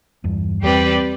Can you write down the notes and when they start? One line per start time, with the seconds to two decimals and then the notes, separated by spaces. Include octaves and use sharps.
0.24 E2 G2
0.62 E2 G3 C4 G4 B4 D5